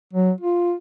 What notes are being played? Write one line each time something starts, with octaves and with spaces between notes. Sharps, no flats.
F#3
F4